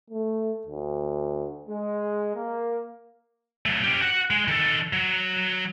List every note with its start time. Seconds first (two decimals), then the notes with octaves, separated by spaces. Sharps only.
0.10 A3
0.67 D2
1.69 G#3
2.36 A#3
3.66 F#3 A3
3.84 C#4 G4
4.02 F#4 F#5
4.30 G#3
4.48 D#3 A4
4.93 F#3